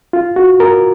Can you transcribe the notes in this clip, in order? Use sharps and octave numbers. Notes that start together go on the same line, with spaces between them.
F4
F#4
A#4